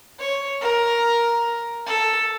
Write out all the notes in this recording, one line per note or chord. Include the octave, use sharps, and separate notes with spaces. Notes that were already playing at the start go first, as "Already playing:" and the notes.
C#5
A#4
A4